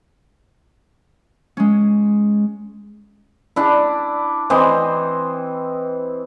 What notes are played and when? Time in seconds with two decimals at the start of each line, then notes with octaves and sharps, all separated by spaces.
1.57 G#3 C#4
3.56 D4 E4
4.50 E3 C4 C5 D#5